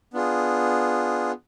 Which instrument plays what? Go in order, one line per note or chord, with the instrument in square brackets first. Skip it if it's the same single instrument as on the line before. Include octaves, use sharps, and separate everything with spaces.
[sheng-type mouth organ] B3 D4 F4 G#4